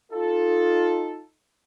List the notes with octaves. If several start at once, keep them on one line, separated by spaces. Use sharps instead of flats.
D#4 F4 A4